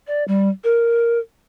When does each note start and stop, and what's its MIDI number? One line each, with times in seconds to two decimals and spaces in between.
0.07 0.24 74
0.28 0.50 55
0.64 1.19 70